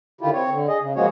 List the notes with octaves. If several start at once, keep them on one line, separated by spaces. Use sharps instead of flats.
D3 D#3 E4 F4 G4
C4 C#5
D3
G#4 D#5
C#3
F3 G#3 A#3 F#4 G#4 C#5